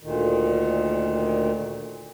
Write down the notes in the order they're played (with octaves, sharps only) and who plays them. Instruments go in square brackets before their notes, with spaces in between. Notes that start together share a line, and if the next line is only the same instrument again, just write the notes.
[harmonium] D2 A#2 D#3